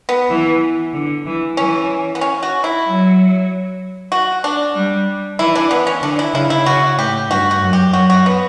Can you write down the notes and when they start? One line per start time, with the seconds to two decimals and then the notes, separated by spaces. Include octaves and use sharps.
0.09 B3
0.30 E3
0.94 D3
1.26 E3
1.57 E3 C#4
2.15 B3
2.21 C#4
2.43 F#4
2.64 E4
2.85 F#3
4.12 F#4
4.44 D4
4.75 G3
5.39 E3 E4
5.55 D4
5.71 B3
5.87 C#4
6.02 D3 D4
6.19 E4
6.34 C#3 E4
6.50 E4
6.66 C#3 F#4
6.98 A2 G4
7.29 G2 F#4
7.51 F#4
7.62 F#2
7.73 G4
7.93 F#2 F#4
8.10 F#4
8.26 B3